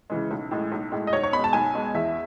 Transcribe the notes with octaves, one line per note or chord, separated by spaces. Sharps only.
C#3 E3 G#3
B1
A2 G#3
B1
A2 G#3
D#5
B1 C#5
C#5
B2 G#3 B5
A5
B1 G#5
B2 G#3
E2 E5